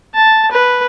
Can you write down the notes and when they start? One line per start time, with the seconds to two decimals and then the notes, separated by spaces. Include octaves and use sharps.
0.14 A5
0.51 B4